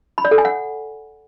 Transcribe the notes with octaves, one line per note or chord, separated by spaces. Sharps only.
B5
D5
A4
G#5
F#5